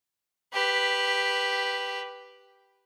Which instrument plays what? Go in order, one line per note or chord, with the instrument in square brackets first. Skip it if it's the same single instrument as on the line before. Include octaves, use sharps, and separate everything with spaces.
[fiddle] G4 B4